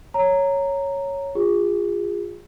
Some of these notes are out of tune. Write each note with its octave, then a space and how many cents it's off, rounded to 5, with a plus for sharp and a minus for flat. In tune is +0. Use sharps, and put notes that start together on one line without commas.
C#5 +0 A#5 -10
F4 +10 G#4 -30